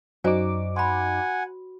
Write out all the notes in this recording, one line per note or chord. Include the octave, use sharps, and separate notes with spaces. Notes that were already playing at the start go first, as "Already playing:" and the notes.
F#2 D#4 F#4 C5 D5 G#5 D6
F#5 G#5 B5 C6